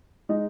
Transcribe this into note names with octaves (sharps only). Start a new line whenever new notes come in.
G#3 D#4